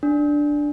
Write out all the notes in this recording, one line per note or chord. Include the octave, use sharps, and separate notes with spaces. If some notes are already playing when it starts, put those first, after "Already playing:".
D4